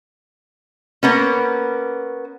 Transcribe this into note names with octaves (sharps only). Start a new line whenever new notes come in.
A#3 B3 C#4